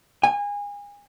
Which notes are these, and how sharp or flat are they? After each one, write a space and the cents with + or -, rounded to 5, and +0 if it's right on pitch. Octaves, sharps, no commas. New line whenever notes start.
G#5 -30